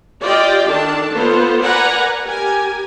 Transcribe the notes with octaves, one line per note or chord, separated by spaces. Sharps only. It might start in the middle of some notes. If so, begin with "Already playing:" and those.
F4 G4 D5 D#5 F5 G5
D#3 D4 A4 A5
A#3 B3 F4 A4 C5
A#4 B4 D5 F#5 G#5 A#5
G4 A#4 G#5